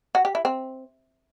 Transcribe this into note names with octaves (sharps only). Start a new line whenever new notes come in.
F#4
G4
E4
C4